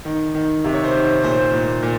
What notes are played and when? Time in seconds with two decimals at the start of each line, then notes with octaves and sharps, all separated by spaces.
0.05 D#3
0.35 D#3
0.64 C3
0.74 C#5
0.84 C5
0.94 D#3
1.04 C5
1.23 A#2 C5
1.53 A#2
1.83 A#2